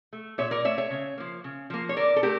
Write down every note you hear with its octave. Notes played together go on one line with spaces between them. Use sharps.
A3
A#2 C#5 E5
A#4 D5
A3 C#5 E5
C#5 E5
C#3
F3 A#3
C#3
F3 A#3
C#5
D3 A#4 D5
A4
A3 G4 A#4